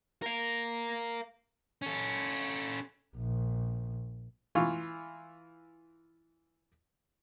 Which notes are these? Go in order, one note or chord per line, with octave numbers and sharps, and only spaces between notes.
A#4 F5
C#4 A4
A#1
E3 F4 C#6